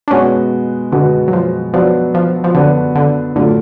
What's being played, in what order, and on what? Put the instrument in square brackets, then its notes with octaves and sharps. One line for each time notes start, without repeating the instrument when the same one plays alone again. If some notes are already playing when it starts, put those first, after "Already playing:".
[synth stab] D4
[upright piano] B2 G#3 B3 F#4 [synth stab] C#4
[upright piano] B2 G#3 B3 F#4 [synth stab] D3
[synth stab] F#3
F3
[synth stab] F3 [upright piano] F#3 B3 D4 F#4
[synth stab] F3
F3
[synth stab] D3 [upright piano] F#3 B3 D4 F#4
[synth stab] D3
[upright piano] A2 F#3 A3 F4 [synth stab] D3